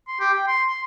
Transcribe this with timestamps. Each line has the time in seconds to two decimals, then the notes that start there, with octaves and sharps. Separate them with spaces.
0.08 C6
0.20 G4
0.34 G5
0.47 C6
0.69 C6